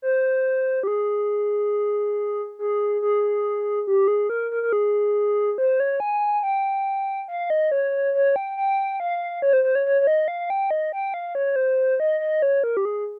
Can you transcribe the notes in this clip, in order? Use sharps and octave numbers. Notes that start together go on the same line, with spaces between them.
C5
G4
G#4
G#4
G#4
G4
G#4
A#4
A#4
A#4
G#4
C5
C#5
G#5
G5
F5
D#5
C#5
C#5
G5
G5
F5
C#5
C5
C5
C#5
C#5
C#5
D#5
F5
G5
D#5
G5
F5
C#5
C5
D#5
D#5
C#5
A#4
G4
G#4